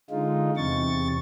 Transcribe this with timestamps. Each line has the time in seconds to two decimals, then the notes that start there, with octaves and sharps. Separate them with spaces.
0.10 D3 G#3 D#4 F4
0.56 E2 C3 C#6 A6